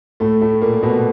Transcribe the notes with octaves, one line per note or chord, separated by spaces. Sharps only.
A2 A3
A2 A3
A#2 A#3
B2 B3